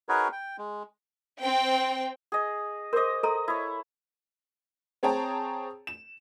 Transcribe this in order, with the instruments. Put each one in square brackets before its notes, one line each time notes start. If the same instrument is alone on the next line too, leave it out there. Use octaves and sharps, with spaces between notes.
[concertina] D#4 F#4 G#4 A#4 B4 C#5
G5
G#3
[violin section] C4 G5
[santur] G#4 D#5
[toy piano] A#4 D6 [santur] C5 D#5
[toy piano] A4 A#5 C6 [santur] D#5
[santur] E4 C#5
[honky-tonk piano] C4 G#4 C#5 G5 A5 A#5
E7